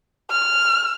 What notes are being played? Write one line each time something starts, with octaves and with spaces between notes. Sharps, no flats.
F6